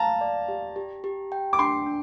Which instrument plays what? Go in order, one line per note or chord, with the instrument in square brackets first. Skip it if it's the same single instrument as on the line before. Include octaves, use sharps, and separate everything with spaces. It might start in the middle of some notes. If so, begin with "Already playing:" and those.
Already playing: [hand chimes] F5 [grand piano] A5 A#5
[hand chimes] D5
G4
G4
G4
G5
[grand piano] D6
[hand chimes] D4 [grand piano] C6
[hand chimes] D4